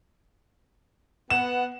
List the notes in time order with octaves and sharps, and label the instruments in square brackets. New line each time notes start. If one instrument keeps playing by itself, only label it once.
[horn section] B3 F#5 [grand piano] E7